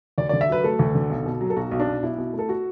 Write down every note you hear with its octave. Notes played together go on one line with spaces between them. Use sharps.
D2 D5
D3 D5
E5
F#3 B4
A3 A4
D2
D3
B1
B2
F#3
A4
B1 F#4
B1
D4
B2
B1 E4
B2
A3
A4
F#4